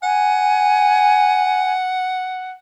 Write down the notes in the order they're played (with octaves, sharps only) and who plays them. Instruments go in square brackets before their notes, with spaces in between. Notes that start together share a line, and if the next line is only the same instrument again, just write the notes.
[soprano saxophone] F#5 [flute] G#5